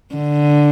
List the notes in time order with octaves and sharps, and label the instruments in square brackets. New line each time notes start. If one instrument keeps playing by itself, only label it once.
[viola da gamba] D3